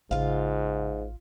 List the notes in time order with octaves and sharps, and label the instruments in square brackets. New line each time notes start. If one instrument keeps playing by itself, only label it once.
[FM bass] A1 [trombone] G#2 [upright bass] C#3 [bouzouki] F4 F5